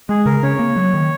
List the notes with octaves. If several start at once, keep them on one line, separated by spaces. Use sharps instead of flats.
G#3 G#4
C#3 A#4
C#4 C#5
A#3
F#3
D#3